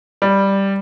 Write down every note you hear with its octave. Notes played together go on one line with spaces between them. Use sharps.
G3